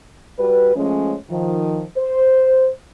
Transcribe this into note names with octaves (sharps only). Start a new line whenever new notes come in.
G3 F#4 B4
F3 G#3 A3 C#4
D#3 F3
C5